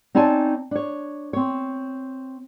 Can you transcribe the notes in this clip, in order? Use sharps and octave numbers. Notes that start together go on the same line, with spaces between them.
C4 D#4 C#5 D5 G#5 A5
D4 C#5
C4 C#5